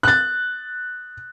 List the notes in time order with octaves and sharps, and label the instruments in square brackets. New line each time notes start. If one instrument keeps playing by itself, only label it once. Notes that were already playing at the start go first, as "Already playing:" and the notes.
[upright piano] F#6 A6